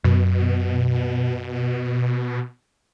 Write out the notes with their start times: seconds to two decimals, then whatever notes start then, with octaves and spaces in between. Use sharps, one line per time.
0.04 F#2 B2